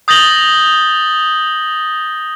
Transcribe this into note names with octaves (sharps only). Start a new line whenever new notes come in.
D#6 G6 A6 A#6 F#7 G7